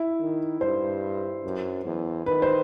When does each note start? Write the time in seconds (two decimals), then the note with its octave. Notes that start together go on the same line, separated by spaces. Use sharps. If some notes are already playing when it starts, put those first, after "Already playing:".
Already playing: E4
0.20 D#3
0.61 G2 C5
1.44 F#2
1.85 E2
2.26 D#3 B4
2.42 C5